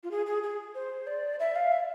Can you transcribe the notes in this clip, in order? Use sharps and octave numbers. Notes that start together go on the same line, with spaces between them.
F4
G#4
G#4
G#4
C5
D5
E5
F5
E5